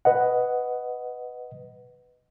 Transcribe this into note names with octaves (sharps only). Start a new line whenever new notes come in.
B4 D#5 F#5